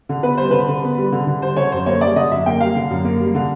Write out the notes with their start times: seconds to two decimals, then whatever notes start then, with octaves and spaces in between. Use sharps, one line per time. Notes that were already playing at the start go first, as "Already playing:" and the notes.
0.09 D3
0.23 B3 B4
0.37 G3 C5
0.51 D3 B4
0.69 D3
0.83 B3
0.98 G3
1.12 D3
1.27 D3
1.42 G3 C5
1.57 D3 C#5
1.72 F#2 C5
1.86 A#3 C#5
2.01 G3 D5
2.16 D3 D#5
2.32 F#2 E5
2.46 A#3 G5
2.60 G3 F5
2.76 D3
2.90 F#2
3.05 A#3
3.20 G3
3.35 D3